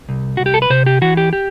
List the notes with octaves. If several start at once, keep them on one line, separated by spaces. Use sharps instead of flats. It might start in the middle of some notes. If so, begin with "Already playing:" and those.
C2
C2 F#4
G4
A4
B4
C3 C5
G4
E3 F#4
G4
G4